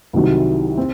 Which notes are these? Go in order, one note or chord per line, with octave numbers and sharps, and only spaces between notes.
C2 C3 D#3 F#3
C4